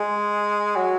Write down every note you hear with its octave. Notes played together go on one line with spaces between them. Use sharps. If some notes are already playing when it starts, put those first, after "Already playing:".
Already playing: G#3
F#3